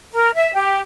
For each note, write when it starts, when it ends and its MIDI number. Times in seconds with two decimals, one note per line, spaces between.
0.12 0.30 70
0.35 0.52 76
0.54 0.79 67